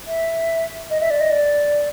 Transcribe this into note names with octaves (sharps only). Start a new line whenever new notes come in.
E5
D#5
E5
D5
D#5
D5